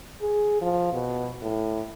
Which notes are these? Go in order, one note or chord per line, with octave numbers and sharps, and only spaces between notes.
G#4
F3
B2
A2